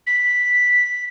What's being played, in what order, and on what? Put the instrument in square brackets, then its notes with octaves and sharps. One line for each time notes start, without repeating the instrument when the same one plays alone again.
[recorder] B6